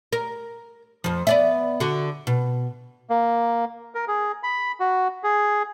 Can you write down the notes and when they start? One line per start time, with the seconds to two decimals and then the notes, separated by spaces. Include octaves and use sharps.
0.13 A#4
1.04 F2 F3
1.27 B3 D5 E5
1.80 D3 F#4
2.27 B2
3.10 A#3
3.95 A#4
4.08 G#4
4.43 B5
4.80 F#4
5.23 G#4